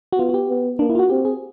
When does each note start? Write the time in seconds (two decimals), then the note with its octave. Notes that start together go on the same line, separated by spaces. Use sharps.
0.13 F#4
0.18 B3 F4
0.29 F#4
0.34 G4
0.49 B3
0.79 A#3 D4
0.90 E4
0.95 F4
0.99 F#4
1.09 C4 G4
1.25 G#4